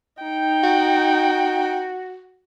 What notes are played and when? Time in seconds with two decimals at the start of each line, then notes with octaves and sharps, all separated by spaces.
0.23 D#4 G5
0.64 F#4